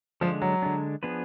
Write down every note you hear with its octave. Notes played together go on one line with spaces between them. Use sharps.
D3 F3 G#3 D4
F#3
D3 G#3 D4
F3 B3 D4 G#4 B4